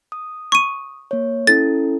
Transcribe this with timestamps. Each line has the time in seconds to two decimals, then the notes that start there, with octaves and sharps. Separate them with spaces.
0.12 D#6
0.52 C#6 D#7
1.11 A#3 C#5
1.47 C#4 E4 A4 A6